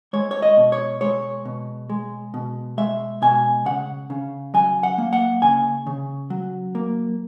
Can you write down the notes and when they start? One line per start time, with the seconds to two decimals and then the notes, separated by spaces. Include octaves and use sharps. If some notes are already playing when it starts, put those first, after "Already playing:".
0.13 G#3 C#5
0.31 C#5
0.42 D#5
0.57 B2
0.72 C#5
1.01 G#3 C#5
1.45 B2
1.90 G#3
2.34 B2
2.78 G#3 E5
3.22 B2 G#5
3.65 C#3 F#5
4.10 C#3
4.54 F#3 G#5
4.83 F#5
4.98 A#3
5.13 F#5
5.42 C#3 G#5
5.87 C#3
6.30 F#3
6.75 A#3